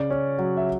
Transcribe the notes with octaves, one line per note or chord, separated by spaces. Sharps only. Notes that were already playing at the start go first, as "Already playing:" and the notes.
Already playing: C#3 D5
C#4
F#3
E5